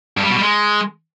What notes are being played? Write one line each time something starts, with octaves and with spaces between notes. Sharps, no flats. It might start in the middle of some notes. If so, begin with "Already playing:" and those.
G2
G3
B2
G3
G#3